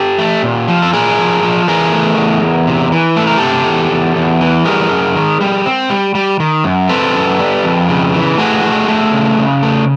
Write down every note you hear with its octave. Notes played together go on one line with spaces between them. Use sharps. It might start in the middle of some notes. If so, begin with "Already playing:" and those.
Already playing: G4 A4
A3
A#2
F3
A4
A#2 G#4 A#4
F3
F3
E3 G#4 A#4
A3
E2
E2
C3
E3
A3 A4
A#4
C3 G4 A4
E2
E2
E2
E3
G3 G#4 A#4
F#2
D#3
G3
C4
G3
G3
D#3
F#2
C4 A4 B4
F#2
G3
F2
C#3
E3
A3 F#4 G#4
A3
A3
C#3
C#3
A3